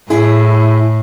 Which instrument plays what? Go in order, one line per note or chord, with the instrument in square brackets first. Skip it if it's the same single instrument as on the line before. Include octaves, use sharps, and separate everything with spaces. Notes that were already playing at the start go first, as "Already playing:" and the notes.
[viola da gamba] A2 [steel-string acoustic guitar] E4 G#4